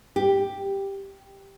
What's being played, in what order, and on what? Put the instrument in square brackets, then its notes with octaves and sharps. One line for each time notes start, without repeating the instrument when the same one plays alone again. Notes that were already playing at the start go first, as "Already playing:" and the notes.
[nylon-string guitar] G4